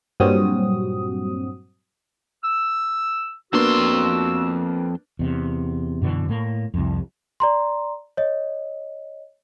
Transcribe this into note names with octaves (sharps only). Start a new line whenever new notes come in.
G2 A#2 F#3 C4 F#4 D#6
E6
F2 A#3 B3 D4 F#4 C6 E6
E2 C3
F#2 B2 D3 E3
A2 A#3
C2 F2
D5 A#5 C6
C#5 D#5